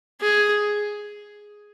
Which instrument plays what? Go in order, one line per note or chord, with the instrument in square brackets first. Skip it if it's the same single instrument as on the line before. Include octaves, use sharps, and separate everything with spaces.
[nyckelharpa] G#4